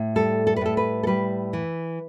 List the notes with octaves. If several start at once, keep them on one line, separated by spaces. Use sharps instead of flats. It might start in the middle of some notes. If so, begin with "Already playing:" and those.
Already playing: A2
G3 A4
A4
B4
A2 A4
B4
A4
G3 B4
E3